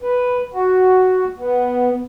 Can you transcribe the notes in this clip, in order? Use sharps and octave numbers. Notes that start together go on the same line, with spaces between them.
B4
F#4
B3